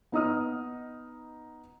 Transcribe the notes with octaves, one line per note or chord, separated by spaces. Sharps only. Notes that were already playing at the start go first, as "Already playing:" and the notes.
B3 D#4 D#5 D#6 F6